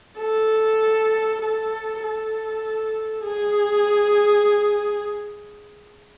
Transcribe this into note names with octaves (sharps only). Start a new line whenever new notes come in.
A4
A4
A4
G#4